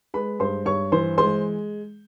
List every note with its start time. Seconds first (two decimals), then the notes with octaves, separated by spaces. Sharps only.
0.14 G#3 B4 B5
0.40 G2 C5 C6
0.66 G2 C#5 C#6
0.92 E3 C5 C6
1.18 G#3 C5 C6